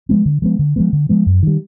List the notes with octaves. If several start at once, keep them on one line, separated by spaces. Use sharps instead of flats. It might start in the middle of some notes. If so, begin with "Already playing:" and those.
F3 G#3 B3
D3
F3 G#3 B3
D3
F3 G#3 B3
D3
F3 G#3 B3
F#2
D#3 G3